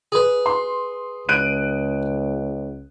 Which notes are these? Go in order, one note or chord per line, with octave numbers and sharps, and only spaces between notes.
G#4 B4
C6
C#2 F#6 D7 D#7